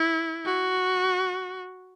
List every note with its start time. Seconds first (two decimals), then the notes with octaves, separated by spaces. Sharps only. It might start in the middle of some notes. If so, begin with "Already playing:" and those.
Already playing: E4
0.45 F#4